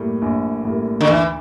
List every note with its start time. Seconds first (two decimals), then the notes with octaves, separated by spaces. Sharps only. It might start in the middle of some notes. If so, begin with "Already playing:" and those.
Already playing: A2 G3 A#3
0.22 A#1
0.65 A2 G3 A#3
1.01 D3
1.07 D2 E3